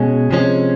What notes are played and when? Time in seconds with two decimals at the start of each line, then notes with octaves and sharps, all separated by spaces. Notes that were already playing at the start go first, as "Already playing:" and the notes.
Already playing: B2 G#3 C#4
0.31 C3 F3 G#3 C#4